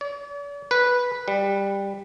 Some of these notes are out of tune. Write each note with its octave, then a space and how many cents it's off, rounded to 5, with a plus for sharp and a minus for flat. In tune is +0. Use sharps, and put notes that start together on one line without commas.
D5 -45
B4 -10
G3 +15